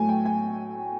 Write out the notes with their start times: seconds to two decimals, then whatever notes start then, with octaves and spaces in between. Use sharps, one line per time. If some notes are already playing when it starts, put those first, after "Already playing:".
Already playing: A2 F#3 A3 G#5
0.09 G5
0.25 G#5